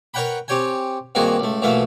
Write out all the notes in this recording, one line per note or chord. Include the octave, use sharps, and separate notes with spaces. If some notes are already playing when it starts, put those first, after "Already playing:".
A#4 B4 C#5 F#5 G5 B5
C4 G4 C#5 G5 G#5
G2 D#3 A#3 C4 F#4 G#4
C#2 A3
A#1 B2 E3 A3 E5 F5